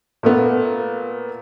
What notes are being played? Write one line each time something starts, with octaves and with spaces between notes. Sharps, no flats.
A#2 A3 B3